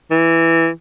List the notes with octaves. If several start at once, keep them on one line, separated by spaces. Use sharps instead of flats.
E3